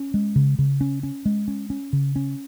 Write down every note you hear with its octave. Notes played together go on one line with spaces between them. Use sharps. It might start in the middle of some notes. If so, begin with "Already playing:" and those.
Already playing: C#4
G#3
C#3
C#3
C#4
C#4
G#3
C#4
C#4
C#3
C#4